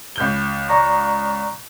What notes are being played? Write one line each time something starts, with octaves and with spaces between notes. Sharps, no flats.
C#2 G6 G7
D5 A#5 C#6